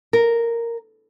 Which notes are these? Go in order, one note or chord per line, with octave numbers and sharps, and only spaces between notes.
A#4